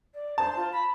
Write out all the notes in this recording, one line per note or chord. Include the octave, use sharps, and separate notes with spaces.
D5
C5 A5
F4
B5